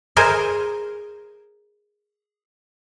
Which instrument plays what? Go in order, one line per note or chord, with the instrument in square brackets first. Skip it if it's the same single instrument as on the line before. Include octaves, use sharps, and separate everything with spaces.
[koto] G#4 A#4 C5 G#5